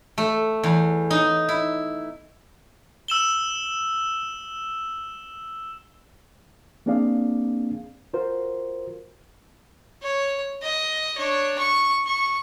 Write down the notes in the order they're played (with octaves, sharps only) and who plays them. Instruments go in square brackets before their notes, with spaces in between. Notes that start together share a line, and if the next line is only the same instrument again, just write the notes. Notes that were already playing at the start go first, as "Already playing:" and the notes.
[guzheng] A3
E2
D#4
E4
[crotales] E6 E7 G7
[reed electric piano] A#3 C4 D4 G#4 D5 F5
F4 F#4 A#4 C5
[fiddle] C#5
D#5
D4 C#5
C#6
C#6